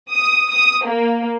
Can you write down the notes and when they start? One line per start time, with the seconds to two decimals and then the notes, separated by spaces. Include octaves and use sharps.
0.11 D#6
0.51 D#6
0.86 A#3